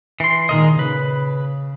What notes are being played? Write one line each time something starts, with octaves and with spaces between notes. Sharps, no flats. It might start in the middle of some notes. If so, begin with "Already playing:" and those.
E3 C6
A#2 D#3 G#3 A#4 D#5
C#3 B4